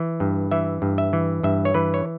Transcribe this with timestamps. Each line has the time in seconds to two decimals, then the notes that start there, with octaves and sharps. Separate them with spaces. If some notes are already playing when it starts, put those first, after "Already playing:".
Already playing: E3
0.20 G2
0.51 E3 E5
0.82 G2
0.98 E5
1.13 E3
1.43 G2 E5
1.65 C#5
1.74 E3 B4
1.94 C#5